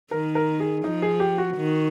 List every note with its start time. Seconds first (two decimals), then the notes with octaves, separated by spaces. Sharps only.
0.11 D#3 A#4
0.35 A#4
0.60 G#4
0.84 F3 D#4
1.02 G#4
1.20 G4
1.38 F#4
1.57 D#3